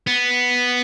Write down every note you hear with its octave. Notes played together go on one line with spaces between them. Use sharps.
B3